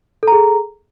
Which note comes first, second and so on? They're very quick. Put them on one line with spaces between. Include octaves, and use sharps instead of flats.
A4 A#5 G#4